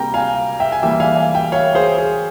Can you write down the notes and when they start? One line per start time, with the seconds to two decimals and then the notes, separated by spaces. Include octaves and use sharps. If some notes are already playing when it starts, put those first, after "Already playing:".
Already playing: C3 G3 A#3 G5 A#5
0.14 F5 G#5
0.60 E5 G5
0.72 G#5
0.82 E3 G3 A#3 E5 G5
1.00 F5 G#5
1.17 F5 G#5
1.34 E5 G5
1.52 C#5 F5
1.75 G#4 C5
1.98 G#4